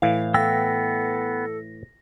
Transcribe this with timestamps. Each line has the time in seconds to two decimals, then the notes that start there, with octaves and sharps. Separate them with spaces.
0.02 A2 E3 F5
0.34 B3 A4 G5 E6 A#6